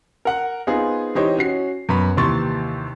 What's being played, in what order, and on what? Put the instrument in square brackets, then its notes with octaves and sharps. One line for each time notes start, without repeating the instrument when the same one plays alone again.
[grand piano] A#4 F#5
B3 C4 D#4 F4 G#4
E3 D#4 G4 C5 C#5 D#5
C#4 F#4 C7
F#2 B3 B5
D#2 C3 E3 C6 C#6 A6